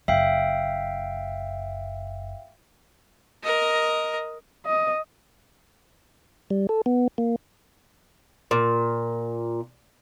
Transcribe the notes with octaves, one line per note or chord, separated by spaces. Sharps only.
F#1 E5 F5 G5
A#4 D#5
D#5
G3
A4
B3
A#3
A#2